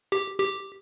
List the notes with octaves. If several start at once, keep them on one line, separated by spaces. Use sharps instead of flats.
G4
G4